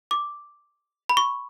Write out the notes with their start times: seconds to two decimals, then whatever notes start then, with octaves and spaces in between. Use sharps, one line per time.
0.11 D6
1.09 B5
1.17 C#6